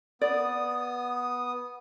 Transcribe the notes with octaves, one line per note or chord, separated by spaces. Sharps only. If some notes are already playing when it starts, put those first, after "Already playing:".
B3 D5 D#6